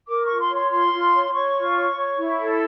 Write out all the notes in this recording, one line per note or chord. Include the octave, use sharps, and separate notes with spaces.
A#4 D6
C#6
F4
C6
C#5
C6
F4 C6
F4
C#5
C#5 C#6
F4
C#5
C#5
E4
A4